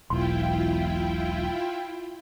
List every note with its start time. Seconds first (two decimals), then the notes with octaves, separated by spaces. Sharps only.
0.10 E1 B1 E3 E4 F4 G5 C6